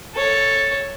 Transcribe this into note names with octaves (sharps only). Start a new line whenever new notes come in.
A4 C#5